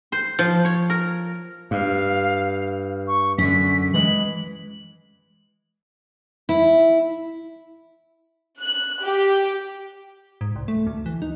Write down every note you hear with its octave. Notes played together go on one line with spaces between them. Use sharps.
C5
F3
C#5
A#4
G2 F5
C#6
F#2 D3 B6
E3 G#3 F#7
E4
F#6
G4
G#2
C2
A3
D2
E3
D#4